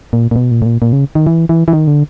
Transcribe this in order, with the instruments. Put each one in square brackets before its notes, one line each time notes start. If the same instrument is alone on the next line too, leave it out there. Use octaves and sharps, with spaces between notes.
[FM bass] A#2
A#2
B2
A#2
A2
A#2
A#2
C#3
D#3
E3
E3
E3
D#3
D3